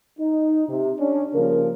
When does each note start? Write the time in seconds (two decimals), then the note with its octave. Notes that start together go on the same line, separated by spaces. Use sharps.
0.20 D#4
0.69 C3
0.99 C#4 D4
1.35 C#3 F3 G3 A#3 A#4